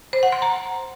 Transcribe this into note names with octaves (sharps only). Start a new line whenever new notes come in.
C5
F#5
C6
A#5